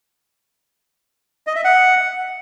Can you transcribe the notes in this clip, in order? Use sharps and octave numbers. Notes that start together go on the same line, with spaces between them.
D#5
E5
F#5